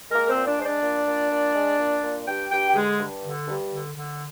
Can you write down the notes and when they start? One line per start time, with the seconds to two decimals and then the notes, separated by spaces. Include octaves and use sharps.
0.11 G#3 A#3 A#4
0.29 C4 C5
0.35 A#2
0.47 D4 D5
0.59 G#3 C5
0.65 D4 D5
0.83 A#2
1.08 A#2
1.31 A#2
1.56 G#3
1.80 A#2
2.04 A#2
2.28 G2 G4 G5
2.52 G2 G4 G5
2.67 G4
2.75 D3 G#3 G#4
3.00 G2
3.24 D3
3.48 G2
3.72 D3
3.96 D3